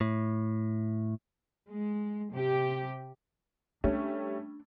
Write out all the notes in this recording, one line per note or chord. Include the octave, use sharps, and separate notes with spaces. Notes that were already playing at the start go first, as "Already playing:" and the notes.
A2
G#3
C3 G4
G3 A3 C#4 D4